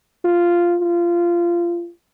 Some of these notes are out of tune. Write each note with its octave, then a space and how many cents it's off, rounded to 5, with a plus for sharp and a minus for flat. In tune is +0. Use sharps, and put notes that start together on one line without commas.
F4 -5
F4 -20